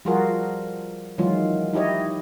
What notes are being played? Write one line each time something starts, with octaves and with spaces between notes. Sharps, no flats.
F3 G3 F4 F#4 G#4 A#4
D#3 E3 F#3 G#3 C#4 F4
D#4 E4 G4 C#5 D#5